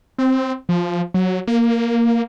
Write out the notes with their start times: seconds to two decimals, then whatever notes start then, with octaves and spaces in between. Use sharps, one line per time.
0.18 C4
0.69 F3
1.14 F#3
1.47 A#3